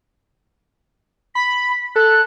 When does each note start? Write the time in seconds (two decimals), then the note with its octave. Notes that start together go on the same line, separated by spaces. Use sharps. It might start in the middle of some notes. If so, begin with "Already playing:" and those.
1.35 B5 B6
1.96 A4 F#6